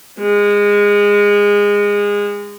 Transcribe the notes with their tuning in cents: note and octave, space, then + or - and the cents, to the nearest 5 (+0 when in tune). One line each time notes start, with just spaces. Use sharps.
G#3 -20